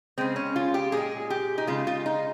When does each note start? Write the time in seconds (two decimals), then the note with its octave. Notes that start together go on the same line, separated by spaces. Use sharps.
0.18 C#3 G#3 C4
0.36 C#4
0.56 F4
0.74 G4
0.92 A#2 G#3 G#4
1.30 G4
1.58 D#4
1.67 C#3 G#3 F4
1.87 F4
2.06 D#4